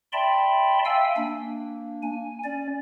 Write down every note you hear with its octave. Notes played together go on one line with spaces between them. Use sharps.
D5 E5 G5 A5 B5 C6
E5 F5 G5 G#5 E6
A#3 D4
G#5
C#4 D5